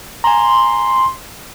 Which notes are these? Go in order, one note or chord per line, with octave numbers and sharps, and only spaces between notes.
G#5 A#5 C6